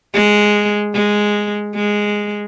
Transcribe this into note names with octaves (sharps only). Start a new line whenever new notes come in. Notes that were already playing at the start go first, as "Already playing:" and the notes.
G#3
G#3
G#3